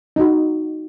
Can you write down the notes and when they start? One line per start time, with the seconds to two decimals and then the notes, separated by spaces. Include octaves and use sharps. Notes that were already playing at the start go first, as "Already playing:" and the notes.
0.16 D#4 F#4